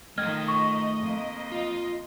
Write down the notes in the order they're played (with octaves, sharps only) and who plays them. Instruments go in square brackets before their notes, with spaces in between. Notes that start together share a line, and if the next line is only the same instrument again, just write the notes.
[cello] D#3 F3 [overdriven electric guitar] A3 G5 [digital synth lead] D#5 [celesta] F6 G#6
[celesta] C#6
[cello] F2 A#3
[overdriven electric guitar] F4